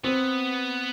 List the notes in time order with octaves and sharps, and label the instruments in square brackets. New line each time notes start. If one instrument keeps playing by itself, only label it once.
[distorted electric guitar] B3 [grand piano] C4